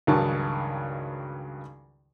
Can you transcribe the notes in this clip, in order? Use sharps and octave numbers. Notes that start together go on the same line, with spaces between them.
C#2 G2 D#3 F#3 A5 C#6